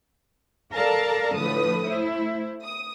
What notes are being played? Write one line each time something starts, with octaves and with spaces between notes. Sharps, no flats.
A4 A#4 D5 F5 A5 A#5
A2 D3 F3 B4 D#6
A3 E4 C5
D#6